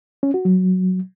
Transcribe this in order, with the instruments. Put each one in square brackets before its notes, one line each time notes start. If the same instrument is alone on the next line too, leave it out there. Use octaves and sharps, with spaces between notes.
[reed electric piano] C#4
F#4
F#3